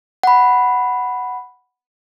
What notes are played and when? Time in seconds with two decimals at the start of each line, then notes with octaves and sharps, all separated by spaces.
0.23 F#5 B5